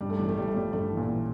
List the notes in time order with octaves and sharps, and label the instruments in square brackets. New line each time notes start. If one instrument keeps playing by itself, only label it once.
[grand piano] G2 [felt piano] G3
[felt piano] A3
[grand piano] A1 [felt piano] G3
[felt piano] A3
[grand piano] A1 [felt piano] G3
[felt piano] A3
[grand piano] F3 [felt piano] G3
[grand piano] G2 [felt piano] A3
[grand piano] A1
[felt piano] A#2
[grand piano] A1